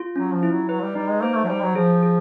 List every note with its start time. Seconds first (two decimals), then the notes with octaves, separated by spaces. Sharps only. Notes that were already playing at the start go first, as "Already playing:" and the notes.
Already playing: F4
0.16 F#3 C#4
0.33 F3
0.43 E4
0.51 F#3
0.69 F#3 B4
0.82 G3
0.95 G3 D#4
1.09 G#3
1.23 A#3 C5
1.36 A3
1.44 F#3
1.49 G3 C5
1.63 F#3
1.75 F3 G#4
2.03 G#4